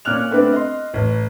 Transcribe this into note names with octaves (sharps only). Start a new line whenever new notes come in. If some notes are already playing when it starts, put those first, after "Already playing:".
A#2 C#4 D5 F6 F#6 F7
A3 B3 C4 D4 E4 B4
D#5 C6
A1